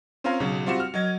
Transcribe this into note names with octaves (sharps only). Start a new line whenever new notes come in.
C4 C#4 F4 A#4 F5 A#5
B1 C#3 F#3
G3 C4 F4 F#4 C#7 E7
F6
F#3 A#4 D#5 G#6